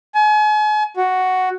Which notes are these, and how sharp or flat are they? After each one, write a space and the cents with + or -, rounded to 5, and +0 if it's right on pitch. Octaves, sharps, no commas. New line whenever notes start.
G#5 +40
F#4 +5